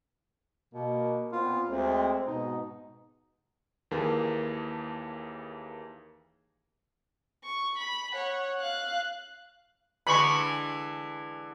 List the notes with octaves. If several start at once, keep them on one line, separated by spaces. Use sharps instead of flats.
B2 A#3
A#2 B3 C4 F4
D2 G#3 A3 C4
G#2 B2 D#4
D#2 E3 A#3 G#4 A#4 A5
C#6
B5
C#5 F#5
F5 F#6
D3 E3 G#3 B5 C#6